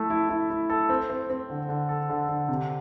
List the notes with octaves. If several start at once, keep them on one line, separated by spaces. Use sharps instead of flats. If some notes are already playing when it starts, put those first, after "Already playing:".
Already playing: A3 E4 A4
E4
E4
E4
A4
C4
C4
C4
D3
D3
A4
D3
D3
C3